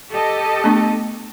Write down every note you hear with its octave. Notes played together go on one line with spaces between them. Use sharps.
G4 A4 D#5
A3 B3 D4